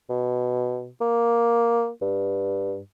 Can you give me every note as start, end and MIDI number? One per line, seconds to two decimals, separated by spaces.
0.10 0.88 47
1.01 1.90 58
2.02 2.79 43